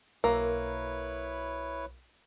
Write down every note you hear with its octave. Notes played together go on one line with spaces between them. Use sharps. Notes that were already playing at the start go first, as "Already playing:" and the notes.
B1 A#3 E4 A#4 B4 C#5